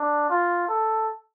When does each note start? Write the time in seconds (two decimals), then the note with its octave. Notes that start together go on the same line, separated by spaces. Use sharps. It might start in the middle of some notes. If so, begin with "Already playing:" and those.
Already playing: D4
0.30 F4
0.68 A4